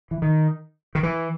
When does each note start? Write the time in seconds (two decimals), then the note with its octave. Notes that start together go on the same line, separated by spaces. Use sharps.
0.11 E3
0.22 D#3
0.95 D#3
1.03 E3